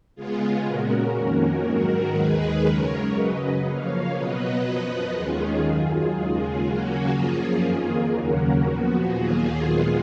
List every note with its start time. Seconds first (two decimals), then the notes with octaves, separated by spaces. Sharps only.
0.15 C#3 G#3 B3 F4 G#4
0.65 A#2 G#3 C#4 F#4 A#4
1.15 F2 D#3 A#3 C#4 F#4 A#4
1.65 G#2 D#3 F#3 F#4 A#4
2.15 D#2 D#3 G#3 G#4 B4
2.65 F#2 C#3 G#3 A#4 C#5
3.15 F#2 C#3 F#3 B4 D#5
3.65 C#3 F3 A#3 C#5 F5
4.14 B2 F#3 B3 B4 D#5
4.64 F#2 F3 B3
5.14 D#2 D#3 G#3 C#4 F4 G#4
5.64 F#2 D#3 F#3
6.14 D#2 C#3 G#3
6.63 C#3 F#3 A#3 C#4 F#4
7.13 F#2 F3 A#3 C#4 F4 G#4
7.63 F2 D#3 A#3
8.13 D#2 C#3 F#3 A#3 C#4 F#4 A#4
8.63 A#2 F3 B3 F#4
9.13 D#2 D#3 F#3 A#3 F4 G#4
9.62 A#2 G#3 B3